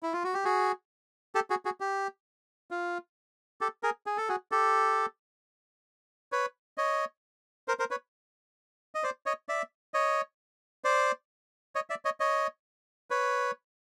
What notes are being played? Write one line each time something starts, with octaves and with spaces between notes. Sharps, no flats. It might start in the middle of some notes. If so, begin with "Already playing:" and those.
E4
F4
F#4
G4
F#4 G#4
G4 A4
F#4 G#4
F#4 G#4
G4
F4
G4 A4
G#4 A#4
G#4
A4
F#4 G#4
G4 A4
B4 C#5
C#5 D#5
A#4 C5
A#4 C5
B4 C#5
D#5
C5 D5
C#5 D#5
D5 E5
C#5 D#5
C5 D5
C#5 D#5
D5 E5
C#5 D#5
C#5 D#5
B4 C#5